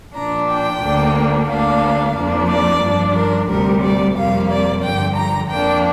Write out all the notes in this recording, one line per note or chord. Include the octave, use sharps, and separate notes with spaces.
A#2 F3 D4 A#5
G5
D2 D3 A#3 D4
D2 D3 A#3 D4 F5
F2 F3 A#3 D4
D5
G2 F3 D4
A#4
D2 C3 G3 A#4
D5
F2 C3 G3 A#3 F5
D5
G2 D3 F3 G5
A#5
F2 F3 A#3 D4 G5